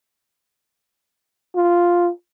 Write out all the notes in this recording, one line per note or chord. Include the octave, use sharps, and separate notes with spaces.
F4